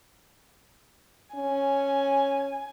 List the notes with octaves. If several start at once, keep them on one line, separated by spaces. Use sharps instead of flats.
C#4 G#5